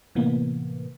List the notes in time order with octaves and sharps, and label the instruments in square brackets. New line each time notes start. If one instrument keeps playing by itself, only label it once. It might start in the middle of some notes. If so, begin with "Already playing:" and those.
[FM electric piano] A2 C3 E3 A#3 B3